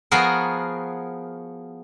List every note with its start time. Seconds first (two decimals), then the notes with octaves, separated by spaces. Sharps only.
0.12 F3 B3 F#4 G#4 A#4